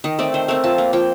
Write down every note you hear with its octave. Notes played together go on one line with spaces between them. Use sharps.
D#3 D#5
A3 C4 D5
D#3 C5
A3 C4 A#4
F3 A5
A#3
F3 G5